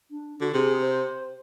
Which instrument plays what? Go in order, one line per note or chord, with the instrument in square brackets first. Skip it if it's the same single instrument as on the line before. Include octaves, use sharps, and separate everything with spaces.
[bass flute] D4
[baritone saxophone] D3 [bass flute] F#4
[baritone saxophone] C3 [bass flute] G#4
[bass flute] C5